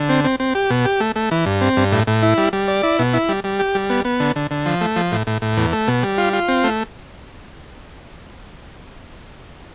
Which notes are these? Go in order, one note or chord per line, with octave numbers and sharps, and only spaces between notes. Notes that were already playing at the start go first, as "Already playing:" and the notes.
Already playing: D3
C4
C4
C4
G4
B2
G4
A3
A3
E3
G2
C4
G2
A2
A2
E4
G3
G3
D5
E4
B2
E4
G3
G3
G4
G3
B3
B3
D3
D3
D3
F3
A3
F3
A2
A2
A2
E2
A3
B2
G3
F4
F4
C4
A3